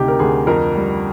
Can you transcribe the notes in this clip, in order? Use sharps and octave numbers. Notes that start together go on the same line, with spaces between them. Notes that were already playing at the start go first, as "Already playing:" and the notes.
Already playing: D2 C3 D#4 G4
A#4
D2 G#4
F2 A#4
G3